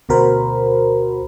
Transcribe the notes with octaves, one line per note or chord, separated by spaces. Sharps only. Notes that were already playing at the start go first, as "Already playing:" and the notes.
D2 B2 F#4 A#4 C5 B5